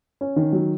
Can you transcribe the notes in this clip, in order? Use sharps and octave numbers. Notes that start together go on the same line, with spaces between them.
C#4
D#3
F#3